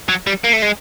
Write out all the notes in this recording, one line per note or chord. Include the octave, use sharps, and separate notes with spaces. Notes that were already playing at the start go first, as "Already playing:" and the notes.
F#3
G3
A#3
A3
G#3